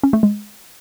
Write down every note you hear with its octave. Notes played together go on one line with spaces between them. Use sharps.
C#4
A3
G#3